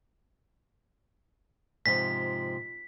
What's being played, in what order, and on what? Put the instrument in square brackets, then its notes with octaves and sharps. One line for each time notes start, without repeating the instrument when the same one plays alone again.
[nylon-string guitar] G#2 C3 F3 [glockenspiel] B6